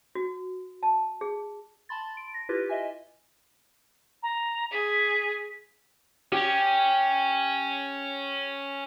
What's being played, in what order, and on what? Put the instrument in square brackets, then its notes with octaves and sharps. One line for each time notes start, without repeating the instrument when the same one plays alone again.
[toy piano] F#4
A5
G#4
[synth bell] A5 B5 C6 A6
D7
A#6
E4 F4 G4 B4
D#5 E5 G#5
[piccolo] A#5
[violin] G#4 [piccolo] B6
[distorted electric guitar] C#4 [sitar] G4